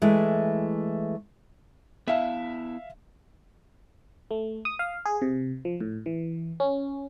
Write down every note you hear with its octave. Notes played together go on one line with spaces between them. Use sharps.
E3 G#3 A3
B3 E4 E5 F5 A5
A3
D#6
F5
G#4
C3
F3
A2
E3
C#4